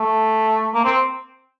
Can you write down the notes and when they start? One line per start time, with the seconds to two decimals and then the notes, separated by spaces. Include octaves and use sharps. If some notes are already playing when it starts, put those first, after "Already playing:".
Already playing: A3
0.74 A#3
0.85 C4